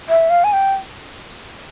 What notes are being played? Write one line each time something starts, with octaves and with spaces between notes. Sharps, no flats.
E5
F5
G#5
G5